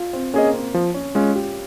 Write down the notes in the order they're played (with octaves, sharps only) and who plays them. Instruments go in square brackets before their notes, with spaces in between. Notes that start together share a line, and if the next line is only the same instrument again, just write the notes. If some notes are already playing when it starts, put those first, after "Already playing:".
Already playing: [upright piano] F4
C4
[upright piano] A#3 [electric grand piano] C#4 G#4 D#5
[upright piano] C4
[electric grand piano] F3
[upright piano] C#4
[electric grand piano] G#3 C#4 [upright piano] F4
[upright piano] G4